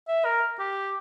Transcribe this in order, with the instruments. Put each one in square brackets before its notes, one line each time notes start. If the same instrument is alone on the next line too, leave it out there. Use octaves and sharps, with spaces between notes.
[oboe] E5
A#4
G4